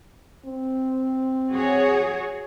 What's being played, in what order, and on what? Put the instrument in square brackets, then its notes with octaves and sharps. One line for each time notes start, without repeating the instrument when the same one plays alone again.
[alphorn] C4
[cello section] F#4 G#4 C#5